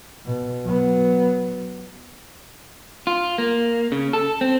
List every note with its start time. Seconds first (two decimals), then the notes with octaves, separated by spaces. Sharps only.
0.25 B2
0.64 F#3 B3
3.07 F4
3.38 A#3
3.92 C#3
4.13 A4
4.41 C4